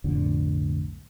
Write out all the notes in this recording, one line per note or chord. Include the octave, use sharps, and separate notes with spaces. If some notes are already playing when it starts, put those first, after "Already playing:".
B1 F2 A2 D3